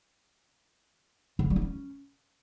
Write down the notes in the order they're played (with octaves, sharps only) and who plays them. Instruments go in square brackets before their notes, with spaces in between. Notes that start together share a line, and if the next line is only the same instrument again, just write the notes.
[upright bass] D3
C#3
G3
D#4
C#4